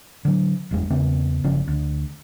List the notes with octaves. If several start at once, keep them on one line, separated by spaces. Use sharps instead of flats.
D3 F#3
F#1 E2 G#3
E2 C#3 B3 C4
G1 C#3 F3 C#4
D2